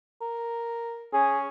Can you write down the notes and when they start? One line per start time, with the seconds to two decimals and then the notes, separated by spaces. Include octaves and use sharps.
0.21 A#4
1.13 C#4 G#4